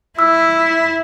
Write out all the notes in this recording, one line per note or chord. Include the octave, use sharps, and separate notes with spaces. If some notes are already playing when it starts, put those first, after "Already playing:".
E4 E6